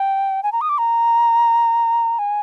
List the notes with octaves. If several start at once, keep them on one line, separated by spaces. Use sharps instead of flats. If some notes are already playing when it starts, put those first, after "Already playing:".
Already playing: G5
G#5
A#5
D#6
D6
A#5
G#5